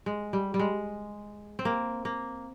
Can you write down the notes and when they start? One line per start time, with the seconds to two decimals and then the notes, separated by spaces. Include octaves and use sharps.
0.06 G#3
0.33 G3
0.54 G3
0.59 G#3
1.59 C4
1.65 A#3
2.05 A#3